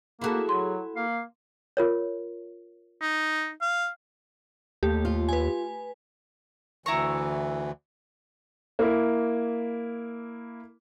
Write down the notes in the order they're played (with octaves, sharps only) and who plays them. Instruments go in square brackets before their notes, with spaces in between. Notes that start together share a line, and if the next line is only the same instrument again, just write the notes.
[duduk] A#3 [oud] E4 F#4 A4 [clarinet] G#4
[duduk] F#3 [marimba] C6
[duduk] A#3 [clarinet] F5
[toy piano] F4 A#4 C#5
[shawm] D#4
F5
[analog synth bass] D#2 [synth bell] A3 G4
[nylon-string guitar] F4
[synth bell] B4 G#5
[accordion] D2 E3 [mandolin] E4 A#5 C#6
[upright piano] A#3 E4